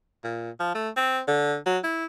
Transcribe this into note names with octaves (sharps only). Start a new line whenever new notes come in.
A#2
F3
A3
C4
D3
F#3
E4